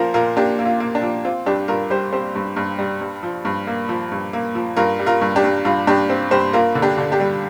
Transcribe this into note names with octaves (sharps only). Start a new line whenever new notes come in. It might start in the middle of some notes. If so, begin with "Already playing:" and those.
Already playing: A#2 F3 F4 A#4 C5
A#2 F4 A#4
A#3 D4 G4
A#3
F4
A#3
D4
F3
C4 F4
G2 D4 G4
G2 F4 A#4
G3 G4 C5
C4 G4 C5
G2
G2
G3
G2
F3
G2
A#3
F3
G2
A#3
F3
G2 F4 A#4
G3
F4 A#4
G2
D4 G4
G2
G2 F4
G2 D4 G4
C4
G2 G4 C5
A#3 F4 A#4
D3
D4 G4
D3
D4 G4
G3